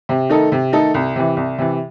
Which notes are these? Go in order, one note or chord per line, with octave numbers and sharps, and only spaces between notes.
C3
D#3 A3 D#4 A4
C3
D#3 A3 D#4 A4
C2
C3 E3
C2
C3 E3